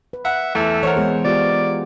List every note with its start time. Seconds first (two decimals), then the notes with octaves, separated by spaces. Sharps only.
0.13 B4
0.25 E5 F#5
0.55 E2 A3
0.83 E3 A#4 C5 C#5 F#5
0.96 G#3 B3 G#4
1.25 B3 F4 G4 D5